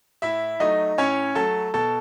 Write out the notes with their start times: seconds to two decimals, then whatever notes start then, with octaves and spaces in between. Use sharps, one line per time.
0.22 A2 E4 E5
0.60 F#3 A3 D#4 D#5
0.98 A2 C#4 C#5
1.35 F#3 A3 A4 A5
1.74 B2 A4 A5